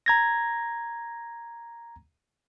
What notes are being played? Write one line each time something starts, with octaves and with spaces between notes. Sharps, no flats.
A#5 G#6 A#6